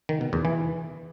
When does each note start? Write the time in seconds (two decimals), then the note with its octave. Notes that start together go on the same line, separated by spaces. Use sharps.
0.09 D#3
0.21 B2
0.33 E2
0.45 E3